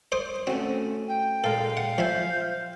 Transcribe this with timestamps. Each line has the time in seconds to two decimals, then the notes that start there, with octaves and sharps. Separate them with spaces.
0.12 C5 D6 D#6
0.47 A3 C4 C#4 F#4
1.08 G5
1.44 A#2 G#3 A4 F5
1.77 F#5
1.98 F3 C5 E5 G#5